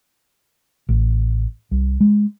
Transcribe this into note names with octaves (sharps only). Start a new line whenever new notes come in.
A1
C2
G#3